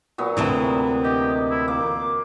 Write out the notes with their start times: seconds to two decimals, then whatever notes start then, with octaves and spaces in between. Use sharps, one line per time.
0.18 A#2 F#3 B3
0.37 D2 C3 E3
1.04 G4 D#5
1.51 E4
1.68 A#3 D6